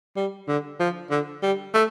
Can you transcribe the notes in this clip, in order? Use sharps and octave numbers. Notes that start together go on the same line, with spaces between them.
G3
D3
F3
D3
G3
A3